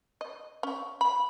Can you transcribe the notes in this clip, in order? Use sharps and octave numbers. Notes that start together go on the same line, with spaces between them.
D#5
C#4
B5